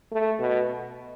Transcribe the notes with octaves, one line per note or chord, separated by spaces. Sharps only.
A3
B2